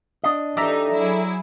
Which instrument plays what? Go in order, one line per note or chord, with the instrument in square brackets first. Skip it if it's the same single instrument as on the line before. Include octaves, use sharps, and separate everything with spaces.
[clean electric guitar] D4 D#5
[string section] E3 D#4 [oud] G4 A4 [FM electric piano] D5 E5 A#5
[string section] F#3 E4 G#4